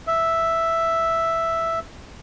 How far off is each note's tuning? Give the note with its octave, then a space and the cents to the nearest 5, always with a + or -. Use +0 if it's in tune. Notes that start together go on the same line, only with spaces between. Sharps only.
E5 +0